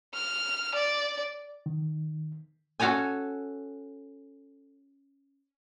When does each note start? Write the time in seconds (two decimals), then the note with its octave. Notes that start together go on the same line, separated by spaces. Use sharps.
0.14 F6
0.75 D5
1.66 D#3
2.80 C#4 F#4 A4 C#5 G#5